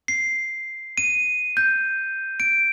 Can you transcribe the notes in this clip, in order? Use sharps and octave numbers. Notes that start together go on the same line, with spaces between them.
C7
D#7
G6
D7